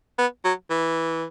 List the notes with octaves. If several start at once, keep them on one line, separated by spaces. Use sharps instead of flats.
B3
F#3
E3